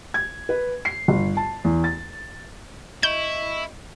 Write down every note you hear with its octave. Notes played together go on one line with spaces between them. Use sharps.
G#6
B4
C7
G1
A5
E2
A6
E4 D#5 C#6 G6